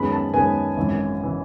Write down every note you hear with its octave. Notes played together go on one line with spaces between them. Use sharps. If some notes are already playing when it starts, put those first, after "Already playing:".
Already playing: F#2 D#3 G#3 B3 B5
A5
F#2 D#3 G#3 B3 G#5
G#1 F#2 E3
E3